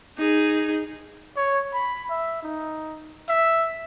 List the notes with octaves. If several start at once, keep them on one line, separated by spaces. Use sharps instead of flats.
D#4 G#4
C#5
B5
E5
D#4
E5